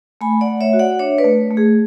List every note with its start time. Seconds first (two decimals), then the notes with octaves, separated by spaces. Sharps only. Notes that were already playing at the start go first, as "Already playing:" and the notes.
0.21 A3 G#5 B5
0.41 D5 F#5
0.47 A3
0.61 C#5 E5
0.73 F#4
0.79 D5 F#5
0.99 D4 C#5 E5
1.18 B4 D5
1.24 A3
1.51 A3
1.57 G#4